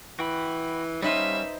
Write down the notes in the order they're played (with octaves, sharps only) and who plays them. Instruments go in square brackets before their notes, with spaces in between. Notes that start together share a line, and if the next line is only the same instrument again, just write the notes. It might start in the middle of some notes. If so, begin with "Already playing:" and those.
[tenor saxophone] E3 [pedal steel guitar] F#4 G5 B5
[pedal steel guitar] G3 F5 [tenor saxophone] C#4 [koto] D#4 B4 C5 [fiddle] E5